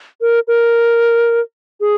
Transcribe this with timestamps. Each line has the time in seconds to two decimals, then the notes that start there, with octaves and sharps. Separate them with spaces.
0.21 A#4
0.48 A#4
1.80 G#4